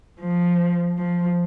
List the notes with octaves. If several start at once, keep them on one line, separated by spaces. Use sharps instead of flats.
F3
F3